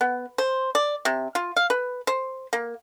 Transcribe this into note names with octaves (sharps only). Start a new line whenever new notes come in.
B3
C5
D5
C3
F4
F5
B4
C5
A#3